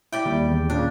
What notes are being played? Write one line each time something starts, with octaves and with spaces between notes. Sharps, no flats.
E4 G4 D5 G5
D#2 G3
E2
A#2 C#3 D4